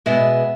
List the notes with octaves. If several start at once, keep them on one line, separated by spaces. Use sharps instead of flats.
B2 G#3 B3 E5